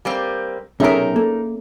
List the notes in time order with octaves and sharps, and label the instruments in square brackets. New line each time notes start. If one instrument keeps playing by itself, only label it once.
[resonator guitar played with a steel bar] G3 A#3 C4
[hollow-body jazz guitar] B1 C3 A#5 [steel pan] C#4 G#4 E5 [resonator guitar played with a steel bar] D#4 A#4
[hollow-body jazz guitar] A#3 [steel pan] A4